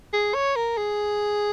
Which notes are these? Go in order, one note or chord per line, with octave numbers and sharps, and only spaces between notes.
G#4
C#5
A#4
G#4